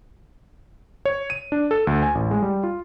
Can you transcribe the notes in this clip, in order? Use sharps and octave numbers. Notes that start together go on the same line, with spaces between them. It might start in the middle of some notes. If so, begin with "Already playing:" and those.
C#5
D#7
D4
A4
D2
G#5
A1
G#3
G3
F4